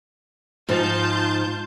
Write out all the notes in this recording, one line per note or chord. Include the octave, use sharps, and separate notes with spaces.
G#2 F3 D#4 F4 A5 G6